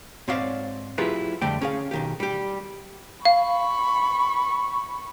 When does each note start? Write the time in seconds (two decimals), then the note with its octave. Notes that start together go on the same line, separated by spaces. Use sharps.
0.28 G#2 C4 C#5 D5 F5
0.98 F#3 E4 F4 G4 G#4 B4
1.41 F2 D3 G3 A3 D5 G5
1.61 C#4 G#4 F5
1.91 B1 D#3 G4
2.20 G3 G4
3.25 F5 B5 C#6